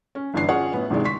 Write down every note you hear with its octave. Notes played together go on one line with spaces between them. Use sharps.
C#4
G1 G2 E3 D4 C7
C#4 F4 G#4 C#5 F#5 C#6
A2 B3
G#1 C3 D#3 E3 G#3 D5
C6 C#6 B6